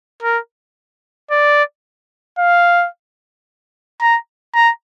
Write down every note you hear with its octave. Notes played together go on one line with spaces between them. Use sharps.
A#4
D5
F5
A#5
A#5